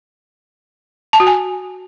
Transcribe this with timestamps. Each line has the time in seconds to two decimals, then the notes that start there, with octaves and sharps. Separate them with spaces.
1.13 A5
1.20 F#4
1.27 G#5